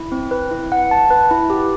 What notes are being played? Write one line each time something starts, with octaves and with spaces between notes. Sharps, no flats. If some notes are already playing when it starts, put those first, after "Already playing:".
Already playing: E4
C4
B4
E4
F#5
A5
B4
E4
G4